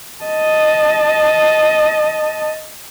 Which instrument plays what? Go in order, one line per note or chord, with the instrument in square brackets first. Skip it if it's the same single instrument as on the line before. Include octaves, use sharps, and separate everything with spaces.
[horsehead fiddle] D#5 A5